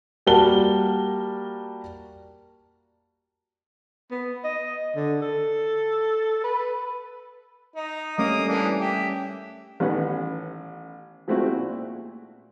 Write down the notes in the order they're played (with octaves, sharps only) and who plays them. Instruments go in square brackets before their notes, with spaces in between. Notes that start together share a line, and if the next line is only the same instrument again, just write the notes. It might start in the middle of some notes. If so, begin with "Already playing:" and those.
[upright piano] G3 A#3 F#4 A#4 A5 G7
[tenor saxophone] B3
D#5
D3
A4
B4
[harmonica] D#4
[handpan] G3 A3 C#4 [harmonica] A#3 D#6
[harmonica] E3 A#3 D4
G4 E5
[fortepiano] A1 D#3 B3 C#4 B4 F#5
F3 G#3 A3 C4 E4 F#4
A#2